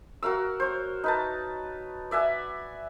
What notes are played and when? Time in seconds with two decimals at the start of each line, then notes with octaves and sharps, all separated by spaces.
0.23 F#4 A#4 F5 E6
0.60 C5 C#5
1.04 D#4 B4 A5
2.11 D5 E5 F#5 G#5